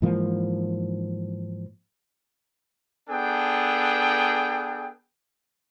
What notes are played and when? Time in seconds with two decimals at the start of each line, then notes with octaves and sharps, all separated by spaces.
0.02 G#2 E3 F3 A#3
3.10 B3 D4 G#4 A4 G5